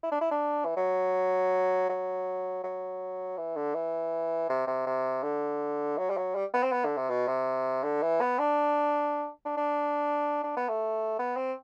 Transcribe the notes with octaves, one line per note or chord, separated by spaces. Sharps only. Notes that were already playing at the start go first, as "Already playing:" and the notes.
E4
D4
E4
D4
E3
F#3
F#3
F#3
E3
D3
E3
C3
C3
C3
D3
F#3
G3
F#3
G3
B3
C4
B3
D3
C3
B2
C3
D3
E3
B3
D4
D4
D4
D4
B3
A3
B3
C4